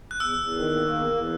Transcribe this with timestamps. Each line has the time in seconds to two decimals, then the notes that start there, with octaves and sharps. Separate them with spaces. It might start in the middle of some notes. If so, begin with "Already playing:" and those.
0.11 F#6
0.20 E2 E6
0.38 E2
0.56 D#3
0.74 A#3
0.92 E2
1.10 E2